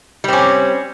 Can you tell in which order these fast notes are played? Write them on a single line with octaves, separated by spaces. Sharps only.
G3 C4 C#4